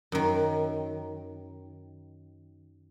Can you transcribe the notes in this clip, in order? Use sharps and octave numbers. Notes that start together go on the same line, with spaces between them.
F#2 D#3